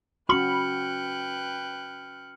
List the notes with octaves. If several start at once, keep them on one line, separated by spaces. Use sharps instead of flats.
C#4 F#4 B4 G5 B5 F6 F#6 C#7